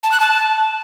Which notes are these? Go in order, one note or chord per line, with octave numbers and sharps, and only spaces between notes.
A5
F#6
A5